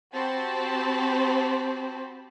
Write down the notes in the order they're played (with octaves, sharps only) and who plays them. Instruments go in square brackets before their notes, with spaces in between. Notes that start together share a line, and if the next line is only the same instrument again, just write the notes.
[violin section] C4 F#4 G4 C5 A5 B5